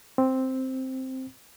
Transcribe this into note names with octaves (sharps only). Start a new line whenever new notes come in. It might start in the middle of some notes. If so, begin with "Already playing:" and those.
C4